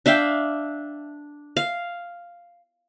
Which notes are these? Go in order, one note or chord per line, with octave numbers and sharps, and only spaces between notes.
D4 E5 F5 G5
F5